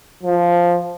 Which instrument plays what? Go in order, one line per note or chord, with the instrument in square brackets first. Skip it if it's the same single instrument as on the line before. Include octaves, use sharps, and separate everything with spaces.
[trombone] F3